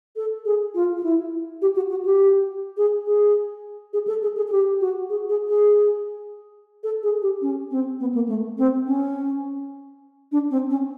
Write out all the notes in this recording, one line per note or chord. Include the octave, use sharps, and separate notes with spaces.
A4
G#4
F4
F4
E4
G4
F#4
F#4
G4
G#4
G#4
G#4
A4
G#4
G#4
G#4
G4
F#4
G#4
G#4
G#4
A4
G#4
G4
C#4
C4
B3
A#3
A3
C4
C#4
D4
C4
C#4